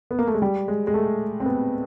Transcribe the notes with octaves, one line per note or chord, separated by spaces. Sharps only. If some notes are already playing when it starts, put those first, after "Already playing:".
B3
A#3
A3
G#3
G3
G#3
G#3
A3
C4
B3